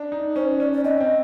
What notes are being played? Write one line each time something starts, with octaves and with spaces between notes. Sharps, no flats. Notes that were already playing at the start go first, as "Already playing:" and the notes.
Already playing: D4
D#4
C#4 C5
C#4 D5
D5
C4 D#5
C4